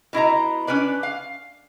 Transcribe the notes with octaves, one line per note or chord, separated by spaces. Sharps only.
B2 E4 D#5 A#5
C#4 D4 B4 D5
F5